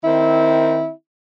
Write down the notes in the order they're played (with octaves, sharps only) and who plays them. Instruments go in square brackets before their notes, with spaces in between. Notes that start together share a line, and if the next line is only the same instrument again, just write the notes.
[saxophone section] D#3 C4 E4